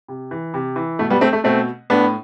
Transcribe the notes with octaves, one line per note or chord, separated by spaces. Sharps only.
C3
E3
C3
E3
B2 A3
G3 B3
A3 C4
A3
B2 A3 C4
A2 B3 D4